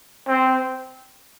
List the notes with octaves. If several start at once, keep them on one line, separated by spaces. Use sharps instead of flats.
C4